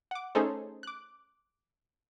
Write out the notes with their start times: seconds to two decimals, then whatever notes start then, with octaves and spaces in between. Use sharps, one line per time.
0.11 F#5 D6
0.35 A3 C#4 D#4 G#4 A4 C5
0.83 D6 F#6